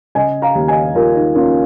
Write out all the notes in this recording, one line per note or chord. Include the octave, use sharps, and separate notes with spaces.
C#3 D#5 G#5
F5 A#5
D#2
D#5 G#5
D#2 F4 A#4
D#4
A#3 C#4 F4